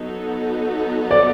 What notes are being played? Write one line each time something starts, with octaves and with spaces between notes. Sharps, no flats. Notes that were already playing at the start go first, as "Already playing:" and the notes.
Already playing: F#3 B3 D#4 F#4 A4
D5